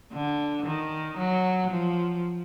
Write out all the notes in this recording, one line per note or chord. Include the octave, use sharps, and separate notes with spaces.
D3
D#3
F#3
F3